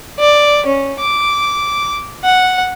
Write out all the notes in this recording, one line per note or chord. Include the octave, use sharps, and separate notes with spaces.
D5
C#4
D6
F#5